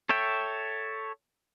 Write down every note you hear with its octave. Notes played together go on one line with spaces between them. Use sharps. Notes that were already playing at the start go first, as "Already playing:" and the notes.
A4 C#5 E5 G5